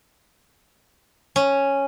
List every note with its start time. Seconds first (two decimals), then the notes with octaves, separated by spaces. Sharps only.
1.36 C#4